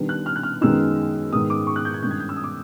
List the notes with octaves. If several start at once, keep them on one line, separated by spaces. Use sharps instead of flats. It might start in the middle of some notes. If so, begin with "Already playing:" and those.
Already playing: D#3 G3 B3 D4
F#6
F6
F#6
F6
F#2 D#3 G#3 B3 D#4 E6
G#2 D#3 G#3 B3 D#6
D6
C#6
F#6
G6
G#6
G2 D#3 G#3 C#4 G6
G#6
G6
E6
D#6
D6